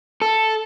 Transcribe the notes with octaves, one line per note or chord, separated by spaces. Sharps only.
A4